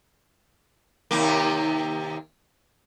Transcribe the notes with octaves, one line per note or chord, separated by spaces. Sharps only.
D#2 C3 A#3